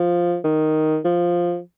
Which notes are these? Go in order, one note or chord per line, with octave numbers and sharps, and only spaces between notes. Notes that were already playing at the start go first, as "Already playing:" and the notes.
Already playing: F3
D#3
F3